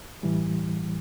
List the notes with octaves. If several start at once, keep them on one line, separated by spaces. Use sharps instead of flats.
A2 E3 G3